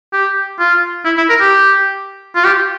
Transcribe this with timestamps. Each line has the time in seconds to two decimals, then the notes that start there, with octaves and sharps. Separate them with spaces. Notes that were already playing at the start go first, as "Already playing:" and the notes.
0.13 G4
0.60 F4
1.05 E4
1.17 E4
1.29 A#4
1.41 G4
2.36 F4
2.44 G4